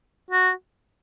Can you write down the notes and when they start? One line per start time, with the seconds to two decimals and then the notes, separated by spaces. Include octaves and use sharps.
0.31 F#4